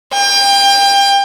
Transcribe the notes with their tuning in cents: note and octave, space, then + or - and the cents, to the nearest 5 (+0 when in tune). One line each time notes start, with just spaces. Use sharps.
G5 +30